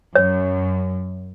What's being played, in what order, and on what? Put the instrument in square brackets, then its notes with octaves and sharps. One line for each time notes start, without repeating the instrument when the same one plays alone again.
[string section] F#2 [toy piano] C#5